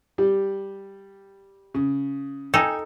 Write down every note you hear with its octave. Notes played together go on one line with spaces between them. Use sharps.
G3 G4
C#3
D#4 A4 G5 G#5